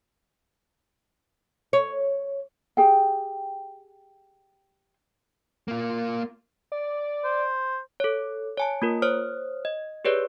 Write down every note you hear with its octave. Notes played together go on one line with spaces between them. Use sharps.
C#5
G4 G#4 G5
A#3 F4
D5
C5
A4 C#5
C#5 G#5 A5
A#3 F4 A#4
C5 C#5 D#6 F6
D#5
G4 G#4 B4 C#5 D5